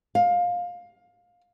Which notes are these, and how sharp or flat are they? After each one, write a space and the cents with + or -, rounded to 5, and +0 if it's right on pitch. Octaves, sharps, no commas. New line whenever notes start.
F5 +20